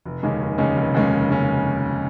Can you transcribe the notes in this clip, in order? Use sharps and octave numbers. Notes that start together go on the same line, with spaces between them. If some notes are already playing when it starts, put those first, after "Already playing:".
F1
D#2 C#3 G#3 C#4
F1
D#2 C#3 G#3 C#4
F1
D#2 C#3 G#3 C#4
F1
C#3 G#3 C#4